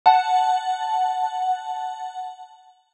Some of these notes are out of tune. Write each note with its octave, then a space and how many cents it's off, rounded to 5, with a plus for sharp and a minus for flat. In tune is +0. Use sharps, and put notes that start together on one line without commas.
F#5 +0 A5 +0